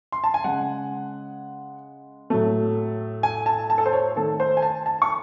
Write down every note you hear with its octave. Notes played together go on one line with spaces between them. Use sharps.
C6
A5
G#5
C#3 G#3 F#5
A2 F#3 A3
G#5
A5
A5
A4
C5
C#5
D#3 A3 A4
C5
G#5
A5
A5
C#6